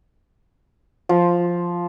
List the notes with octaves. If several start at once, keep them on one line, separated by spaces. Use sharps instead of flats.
F3